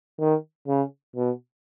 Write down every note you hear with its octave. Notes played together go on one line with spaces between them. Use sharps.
D#3
C#3
B2